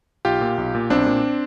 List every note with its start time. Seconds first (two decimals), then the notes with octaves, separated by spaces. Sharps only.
0.25 B1 F4 G4
0.41 A#2
0.58 B1
0.75 A#2
0.90 B1 C4 D4
1.06 A#2